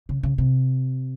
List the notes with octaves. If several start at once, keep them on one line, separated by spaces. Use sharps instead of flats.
C#3
C#3
C3